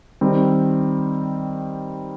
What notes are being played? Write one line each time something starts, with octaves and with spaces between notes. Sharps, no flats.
D#3 G3 C4